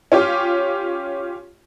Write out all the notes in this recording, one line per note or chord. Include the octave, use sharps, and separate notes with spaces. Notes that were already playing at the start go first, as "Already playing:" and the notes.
C#4 F4 G4